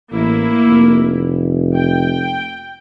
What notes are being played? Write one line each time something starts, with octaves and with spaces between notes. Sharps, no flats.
A1 A#3 E4
F1
G5